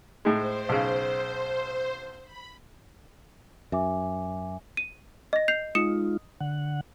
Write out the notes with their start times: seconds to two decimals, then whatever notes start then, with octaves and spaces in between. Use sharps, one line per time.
0.25 A2 G#3 C5
0.69 B1 C#3
2.23 B5
3.72 F#2 E5 G#5 D6
4.77 D#7
5.33 D#5 A#6
5.48 G6 C7 F7
5.75 G#3 D#4 F4 D#6 C#7 E7
6.40 D3 F#5